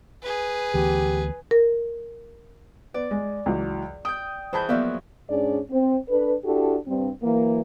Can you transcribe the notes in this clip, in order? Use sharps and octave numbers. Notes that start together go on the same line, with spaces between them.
G#4 B4
D2 E3 B3 G4
A#4
B3 D5
G#3
C#2 E3 F#3
G5 D#6 G6
E3 G#4 C5 A5 B5 G6
F3 F#3 A#3 B3 D5 E5
G#2 C#4 D4 G#4 D5
C4
D4 A4 B4
D4 E4 F#4 G4 A4
G2 C4
E3 F#3 A#3